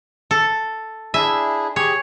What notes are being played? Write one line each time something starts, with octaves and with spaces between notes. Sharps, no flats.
A4
D4 E4 G#4 E5
G4 G#4 C#5